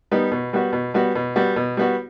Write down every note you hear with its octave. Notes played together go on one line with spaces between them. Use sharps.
G3 B3 D#4
B2
G3 B3 F#4
B2
G3 B3 F#4
B2
G3 B3 F#4
B2
G3 B3 F#4